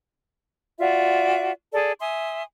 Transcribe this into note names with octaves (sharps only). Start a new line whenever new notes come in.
F4 F#4 D5 E5
G#4 A4 D5
E5 G#5 C6 D#6